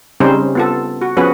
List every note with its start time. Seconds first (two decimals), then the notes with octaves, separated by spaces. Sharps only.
0.20 C#3 G3 C4 C#4 D#4 C5
0.55 B3 F4 A4
1.02 F#4
1.17 F3 B3 C#4 F#4 G#4 B4